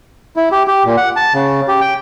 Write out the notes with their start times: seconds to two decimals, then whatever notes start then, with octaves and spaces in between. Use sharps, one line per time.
0.36 E4
0.52 G4
0.68 G4
0.85 A#2
0.97 F#5
1.16 A5
1.34 C#3
1.68 G4
1.81 G5